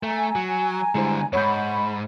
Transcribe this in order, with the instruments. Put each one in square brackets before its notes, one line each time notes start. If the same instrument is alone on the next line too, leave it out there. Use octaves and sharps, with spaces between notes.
[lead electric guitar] A3 [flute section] G#5 A#5
[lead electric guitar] F#3
[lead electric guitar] D3 G3 [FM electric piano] G#3 E4 C5
[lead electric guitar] E2 G#2 [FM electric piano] C#5 C#6 G6 [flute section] F#5 B5